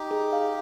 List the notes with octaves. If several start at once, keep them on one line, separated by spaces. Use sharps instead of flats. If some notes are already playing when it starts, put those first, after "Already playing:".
Already playing: D#4 G4
G#4
F5